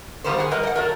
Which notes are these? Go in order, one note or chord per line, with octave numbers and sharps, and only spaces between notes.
D#3 G3 A#3 B3 B4 C5
G#4 F#5
G3 A#4 B4 D#5
D#5 F#5
F#3 A3 A#4